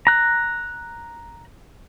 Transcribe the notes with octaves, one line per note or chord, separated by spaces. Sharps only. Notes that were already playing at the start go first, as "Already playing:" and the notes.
A#5 F#6